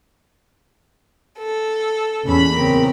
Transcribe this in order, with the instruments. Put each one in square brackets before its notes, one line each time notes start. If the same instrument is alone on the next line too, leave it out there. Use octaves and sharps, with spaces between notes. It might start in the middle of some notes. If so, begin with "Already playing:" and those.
[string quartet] A4
[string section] E2 A#2 B5 [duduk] C#4
[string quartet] C#3 A#4 [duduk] C4